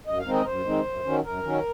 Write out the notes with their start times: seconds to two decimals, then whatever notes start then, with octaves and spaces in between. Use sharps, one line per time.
0.06 F#2 D#5
0.19 F5
0.26 D#3 G#3 C4 D#4
0.33 D#5
0.42 A#4
0.46 F#2 C5
0.65 D#3 G#3 C4 D#4
0.85 F#2
1.05 D#3 F#3 C#4
1.24 F#2 A#4
1.43 D#3 F#3 C#4